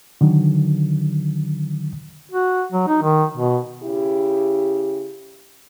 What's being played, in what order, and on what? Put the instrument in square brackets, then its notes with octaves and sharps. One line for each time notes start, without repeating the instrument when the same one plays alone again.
[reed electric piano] D3 D#3 F#3
[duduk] F#4
F#3
D#4
D#3
B2
[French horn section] C#3 E4 G4